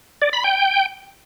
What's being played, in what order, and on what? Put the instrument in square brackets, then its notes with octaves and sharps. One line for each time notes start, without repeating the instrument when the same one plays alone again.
[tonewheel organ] D5
B5
G5